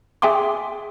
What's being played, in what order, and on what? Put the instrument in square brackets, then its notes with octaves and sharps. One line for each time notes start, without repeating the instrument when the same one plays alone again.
[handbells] G#4 E5 G5 G#5 C6 D6